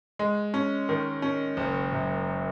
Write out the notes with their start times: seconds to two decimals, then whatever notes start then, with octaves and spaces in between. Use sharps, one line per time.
0.19 G#3
0.54 C#4
0.89 D#3
1.22 C#4
1.57 F#1
1.92 F#2